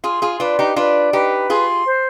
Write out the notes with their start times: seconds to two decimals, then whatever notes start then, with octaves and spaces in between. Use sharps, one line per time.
0.03 F4 G#4 C6
0.22 F4 G#4
0.40 D4 F4 B4
0.59 D#4 G4
0.76 D4 F4 B4
1.13 D#4 G4 B4
1.50 F4 G#4 C6
1.86 C5